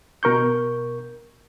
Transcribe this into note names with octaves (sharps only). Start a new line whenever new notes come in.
B2 A#4 C#6 G6